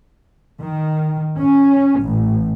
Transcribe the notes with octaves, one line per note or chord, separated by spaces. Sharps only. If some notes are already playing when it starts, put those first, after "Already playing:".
D#3
C#4
A1